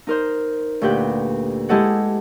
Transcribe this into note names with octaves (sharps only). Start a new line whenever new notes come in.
D#4 A#4 C5
D2 A#2 G4 B4 G5
G#3 E4 G4 A4 D#5 F#5